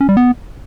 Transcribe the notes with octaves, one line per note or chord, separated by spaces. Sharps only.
C#4
G3
B3